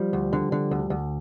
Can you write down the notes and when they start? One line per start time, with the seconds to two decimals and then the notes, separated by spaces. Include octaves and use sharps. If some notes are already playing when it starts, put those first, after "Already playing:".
Already playing: F3 G3
0.13 D2
0.33 D3
0.52 D3
0.71 D2
0.90 D2